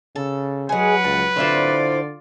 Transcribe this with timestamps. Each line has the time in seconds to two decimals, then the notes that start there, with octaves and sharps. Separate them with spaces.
0.16 C#3 A4
0.69 F#3 G#3 G#4 B4 F#5
1.04 C#2 A5
1.37 D3 C4 E4 F4 C5 D5